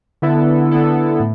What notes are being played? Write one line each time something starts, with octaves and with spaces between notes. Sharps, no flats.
D3 B3 E4 A4
D3 B3 E4 A4
A2